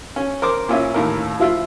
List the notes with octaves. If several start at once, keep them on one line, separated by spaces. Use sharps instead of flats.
C#4
A#4 C5 D6
A#2 C#4 E4
D#2 A2 A#4
F3 E4 F4